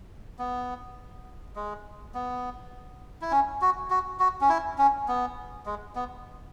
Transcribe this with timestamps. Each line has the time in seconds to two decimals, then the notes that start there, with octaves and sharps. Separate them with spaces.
0.39 B3
1.56 G#3
2.14 B3
3.22 E4
3.31 C#4
3.61 F#4
3.90 F#4
4.20 F#4
4.41 C#4
4.49 E4
4.78 C#4
5.08 B3
5.66 G#3
5.96 B3